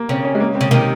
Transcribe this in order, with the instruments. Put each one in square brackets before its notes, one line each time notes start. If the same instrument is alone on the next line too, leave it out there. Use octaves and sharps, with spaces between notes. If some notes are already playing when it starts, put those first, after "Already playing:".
Already playing: [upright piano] A#3
[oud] C#3 [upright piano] C4
[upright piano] C#4
G#3
A#3
C4
[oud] C#3
[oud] C3 D#3 [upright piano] A#3